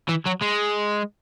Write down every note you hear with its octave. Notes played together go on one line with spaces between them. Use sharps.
E3
F#3
G#3